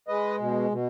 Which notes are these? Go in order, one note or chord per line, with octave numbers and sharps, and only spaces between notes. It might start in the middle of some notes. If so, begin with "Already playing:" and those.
G#3 B4 D#5
B2
B2